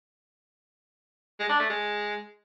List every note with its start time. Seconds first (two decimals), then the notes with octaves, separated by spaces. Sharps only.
1.39 G#3
1.49 D4
1.59 A3
1.69 G#3